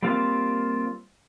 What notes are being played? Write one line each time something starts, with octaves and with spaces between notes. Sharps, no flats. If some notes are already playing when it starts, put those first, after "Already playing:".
G3 A#3 C4 F4 F5